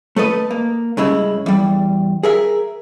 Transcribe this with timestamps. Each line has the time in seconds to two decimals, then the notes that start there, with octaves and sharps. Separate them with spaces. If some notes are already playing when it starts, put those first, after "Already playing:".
0.16 A3 A4 B4 D#5
0.50 A#3
0.97 G2 C#3 G#3 E4
1.46 E2 G3
2.23 G#4 A#4 E5